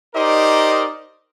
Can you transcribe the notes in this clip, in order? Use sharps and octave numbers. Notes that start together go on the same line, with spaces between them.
D#4 G4 A#4 C5 D5 D#5